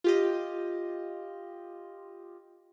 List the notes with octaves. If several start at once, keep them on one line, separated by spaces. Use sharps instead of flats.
F4 G4 D#5